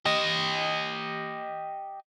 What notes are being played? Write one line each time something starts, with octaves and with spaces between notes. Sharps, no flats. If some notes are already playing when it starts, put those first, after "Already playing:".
G4 D#5